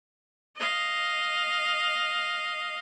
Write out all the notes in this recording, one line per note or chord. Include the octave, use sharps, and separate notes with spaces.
D#5 F5